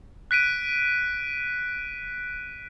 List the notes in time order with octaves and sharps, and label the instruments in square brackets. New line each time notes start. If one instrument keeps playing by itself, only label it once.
[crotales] F#6 B6 D7 D#7